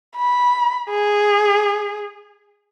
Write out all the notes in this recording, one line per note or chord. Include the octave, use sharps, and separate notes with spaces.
B5
G#4